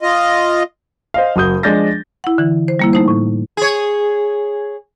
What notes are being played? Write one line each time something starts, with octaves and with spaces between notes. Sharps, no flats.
F4 D#5
C5 D#5 F5
F#1 F#4 D#6 G6
F3 G#3 D4 G6 A6 A#6
E4 F#5
D3 E3
C5
G3 A#3 E4
A3 D#4 C5
A2
G#4 C#5